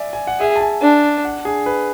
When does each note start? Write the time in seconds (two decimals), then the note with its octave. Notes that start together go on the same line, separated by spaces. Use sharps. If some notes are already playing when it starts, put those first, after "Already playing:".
Already playing: D5 E5 G#5
0.13 G#5
0.27 F#5
0.40 G#4 E5
0.56 A5
0.61 G#5
0.82 D4
1.25 F#5
1.45 G#4
1.66 B4